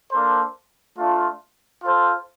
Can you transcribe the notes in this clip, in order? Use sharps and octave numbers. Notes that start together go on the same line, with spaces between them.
A#3 D4 A4 C5
A3 D4 F4
F4 A4 C5